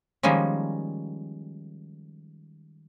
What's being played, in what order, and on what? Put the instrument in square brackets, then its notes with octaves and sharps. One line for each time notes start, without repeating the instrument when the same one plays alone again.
[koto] D#3 F3 G3 G#3 A#3 C#4